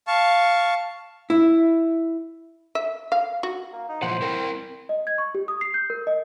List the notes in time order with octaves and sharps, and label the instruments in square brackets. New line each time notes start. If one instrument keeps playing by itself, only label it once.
[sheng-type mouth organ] F5 A5 C#6
[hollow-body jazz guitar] E4
[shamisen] E5
F5
F#4
[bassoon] A#3
D#4
[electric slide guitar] A#2 E3 F3 [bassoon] C5 [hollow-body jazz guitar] F#5
[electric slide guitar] C4 E4 G5 [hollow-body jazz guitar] A#4
[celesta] D#5
G#6
C#6
G4
D#6
C7
G6
A#4
D#5